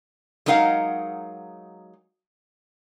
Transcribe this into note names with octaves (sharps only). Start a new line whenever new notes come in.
F#3 G#3 D#4 A#4 F5 F#5